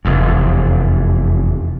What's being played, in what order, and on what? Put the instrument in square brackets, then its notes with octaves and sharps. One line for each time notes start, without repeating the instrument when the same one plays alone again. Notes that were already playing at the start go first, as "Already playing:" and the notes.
[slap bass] F1 E2